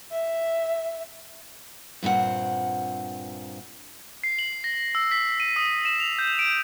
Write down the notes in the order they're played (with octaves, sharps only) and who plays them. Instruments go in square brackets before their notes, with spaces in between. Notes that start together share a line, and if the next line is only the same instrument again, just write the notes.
[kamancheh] E5
[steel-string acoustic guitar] G2 A#2 C4 F#5
[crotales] C7
F#7
A#6
E6
B6
D#7
D#6
E7
F7
G6
D7